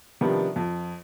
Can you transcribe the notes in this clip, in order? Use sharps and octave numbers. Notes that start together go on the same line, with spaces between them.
C3 D#3 F3 G3 B3 D4
F2